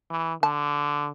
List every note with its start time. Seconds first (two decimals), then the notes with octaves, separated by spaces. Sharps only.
0.10 E3
0.43 D3 A5